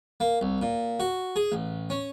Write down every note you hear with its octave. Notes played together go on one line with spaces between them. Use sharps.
A#3
C2
A#2
F#4
G#4
A1
C#4